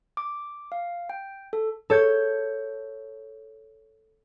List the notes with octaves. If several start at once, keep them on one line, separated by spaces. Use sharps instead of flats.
D6
F5
G5
A4
A4 C#5 G6 G#6